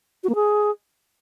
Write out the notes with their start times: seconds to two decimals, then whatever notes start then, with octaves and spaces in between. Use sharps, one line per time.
0.24 F#4
0.29 A#3
0.35 G#4